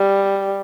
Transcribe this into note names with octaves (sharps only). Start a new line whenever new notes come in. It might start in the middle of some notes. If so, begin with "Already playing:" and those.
Already playing: G3